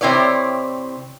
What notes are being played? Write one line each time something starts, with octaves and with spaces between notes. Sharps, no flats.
C3 C4 E4 C#5 D5